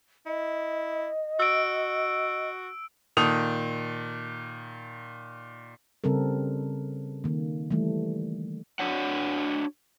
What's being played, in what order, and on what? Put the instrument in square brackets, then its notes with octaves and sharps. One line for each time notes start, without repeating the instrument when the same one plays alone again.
[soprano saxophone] E4 [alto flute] D#5
[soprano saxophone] F#4 [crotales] E6 D7
[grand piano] A#2 D#3 A4 D#6 F7
[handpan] C#3 G3 C4 A4 A#4
D#3 A#3
E3 G3 A3
[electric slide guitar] D4 F#4 C#5 F#5